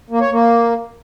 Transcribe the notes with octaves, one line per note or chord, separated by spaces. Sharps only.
A#3
C#5
A#3